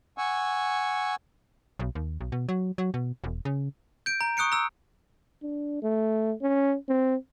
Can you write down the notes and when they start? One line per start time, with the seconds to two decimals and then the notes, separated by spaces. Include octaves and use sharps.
0.18 F#5 G#5 C#6 E6
1.79 B1
1.95 D#2
2.21 B1
2.32 B2
2.49 F#3
2.78 F#3
2.94 B2
3.24 E1
3.45 C#3
4.06 G6 D7
4.21 A#5
4.37 C#6 D#6 F#6 C#7 D7
4.52 A#5 E6
5.43 D4
5.83 A3
6.42 C#4
6.88 C4